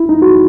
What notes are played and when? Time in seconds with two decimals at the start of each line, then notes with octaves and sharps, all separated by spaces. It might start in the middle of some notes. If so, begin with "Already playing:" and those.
Already playing: E4
0.09 D#4
0.22 F#4